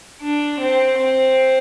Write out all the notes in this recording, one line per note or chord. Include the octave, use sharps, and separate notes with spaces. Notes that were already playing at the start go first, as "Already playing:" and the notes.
D4
C4
C4